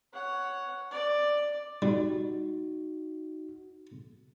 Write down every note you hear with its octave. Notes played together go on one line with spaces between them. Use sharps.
C#5 F#5
D5
G3 D#4 F#4